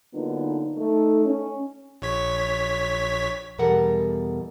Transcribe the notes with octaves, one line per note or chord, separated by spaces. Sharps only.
D3 F#3 A#3 B3 D#4 F4
A3 D#4 A4
C#4
A#1 C#5 B6
E2 B2 G3 A4 A#4 F#5